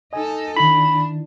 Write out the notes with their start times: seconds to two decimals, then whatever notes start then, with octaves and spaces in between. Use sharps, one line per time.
0.13 D#4 A4 D#5 G#5
0.57 D#3 D4 E4 B5